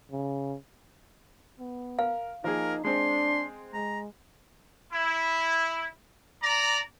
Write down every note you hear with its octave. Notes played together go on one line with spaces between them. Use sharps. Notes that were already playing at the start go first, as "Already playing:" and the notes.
C#3
B3
A#4 F5
F3 A#3 D#4 G#4 A#4
G#3 C4 D4 C6
G#3 A#5
E4
D5 A#5